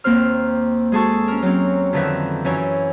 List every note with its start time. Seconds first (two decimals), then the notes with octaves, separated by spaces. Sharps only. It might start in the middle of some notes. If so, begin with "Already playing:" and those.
0.04 D#2 A#3 C4 C5 F6
0.92 G#3 F#4 G#4 A4 A5 C#6
1.27 C#4 A#4
1.42 F#3 C4 C#4
1.93 F2 D3 D#3 B4 E5
2.45 F#2 E3 C#5 G#5